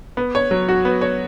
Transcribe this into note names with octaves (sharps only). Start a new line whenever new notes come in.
B3
C#5
F#3
F#4
B3
C#5